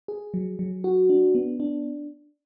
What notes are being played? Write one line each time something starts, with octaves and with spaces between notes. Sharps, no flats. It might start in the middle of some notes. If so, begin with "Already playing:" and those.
G#4
F#3
F#3
F#4
D4
B3
D4